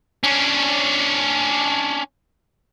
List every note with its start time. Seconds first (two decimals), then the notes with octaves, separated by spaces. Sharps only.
0.24 C#4 D4